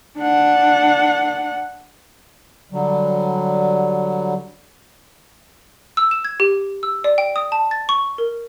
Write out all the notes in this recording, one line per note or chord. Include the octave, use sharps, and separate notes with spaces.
D4 F#5
D3 F#3 G3
E6
E7
G#6
G4
E6
D5
G5
D#6
A5
A6
C#6
A#4